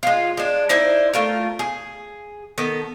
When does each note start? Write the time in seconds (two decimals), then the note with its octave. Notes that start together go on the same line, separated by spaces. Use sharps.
0.03 G#3 F4
0.37 G#3 D4
0.69 D#4 E4 C5 D5
1.14 A3 F4 A#4
1.59 G#4
2.58 D#3 B3 A4